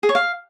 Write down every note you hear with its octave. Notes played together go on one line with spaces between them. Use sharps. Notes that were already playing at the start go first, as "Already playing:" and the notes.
G#4
C#5
F5